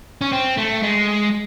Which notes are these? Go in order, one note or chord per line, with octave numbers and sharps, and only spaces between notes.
C#4
C4
A3
G#3